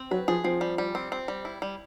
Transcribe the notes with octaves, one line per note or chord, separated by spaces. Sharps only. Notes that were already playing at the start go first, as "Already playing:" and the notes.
Already playing: C4
F#3 B4
F3 G#4
F3 C4
G3
G3
C4
C4
G3
E4
G3